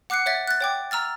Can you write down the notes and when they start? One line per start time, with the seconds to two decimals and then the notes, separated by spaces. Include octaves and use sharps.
0.10 F#5 D6 F#6 C7 C#7
0.26 C#5 E5 A6
0.48 F#6 A6
0.61 C#5 G5 D6
0.91 A#5 E6 F6 A6